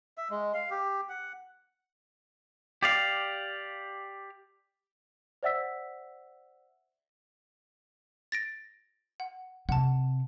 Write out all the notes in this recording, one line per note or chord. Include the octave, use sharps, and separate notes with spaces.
E5
G#3
F5
G4
F#5
G4 D5 F5
C5 D5 E5 F#5 E6 B6
A6 A#6 D7
F#5
C3 F#5 A5